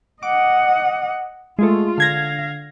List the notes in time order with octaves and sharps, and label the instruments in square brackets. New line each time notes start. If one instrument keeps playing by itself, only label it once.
[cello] D#5 F#5 [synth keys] D6
[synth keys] G#3 A3 [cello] F4
[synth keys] D3 G#6 A#6 [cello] F5